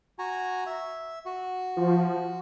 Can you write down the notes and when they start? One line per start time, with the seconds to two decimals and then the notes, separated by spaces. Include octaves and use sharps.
0.19 F#4 G#5 A#5
0.66 E5
1.26 F#4
1.77 F3